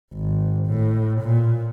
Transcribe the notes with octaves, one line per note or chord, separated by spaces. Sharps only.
G#1
A2
A#2